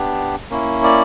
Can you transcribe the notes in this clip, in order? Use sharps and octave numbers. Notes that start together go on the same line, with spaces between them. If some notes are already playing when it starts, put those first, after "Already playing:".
Already playing: B3 D4 G4
A#3 C#4 E4
D5